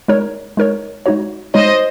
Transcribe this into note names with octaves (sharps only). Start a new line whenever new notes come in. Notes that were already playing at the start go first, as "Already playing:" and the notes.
G#3 D#4 A#4 C#5
G#3 D#4 A#4 C#5
G#3 D#4 F#4 C#5
G#3 D#4 F#4 C5 C#5 D#5